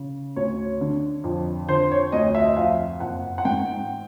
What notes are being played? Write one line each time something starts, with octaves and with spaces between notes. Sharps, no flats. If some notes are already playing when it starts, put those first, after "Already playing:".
Already playing: C#3
D2 C#5
D3
F2
D3 C5
C#5
D2 D#5
E5
F2 F5
F#1 F#5
F#5
G#2 G5